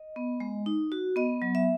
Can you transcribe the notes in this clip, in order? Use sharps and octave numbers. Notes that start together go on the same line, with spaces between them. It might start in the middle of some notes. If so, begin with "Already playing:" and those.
Already playing: D#5
B3
G#3
D#4
F#4
B3 D#5
F#3
E5